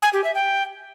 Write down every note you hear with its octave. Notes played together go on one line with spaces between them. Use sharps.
G#5
G4
E5
G5